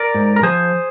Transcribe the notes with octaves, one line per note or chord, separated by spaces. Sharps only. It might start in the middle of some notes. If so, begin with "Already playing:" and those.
Already playing: A#4 D5
G#2
A#4
F3 G#4 C5